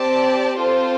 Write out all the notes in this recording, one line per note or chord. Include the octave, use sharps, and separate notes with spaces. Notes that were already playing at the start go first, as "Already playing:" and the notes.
Already playing: C4 G4 D5 A5
C4 F4 A4 C5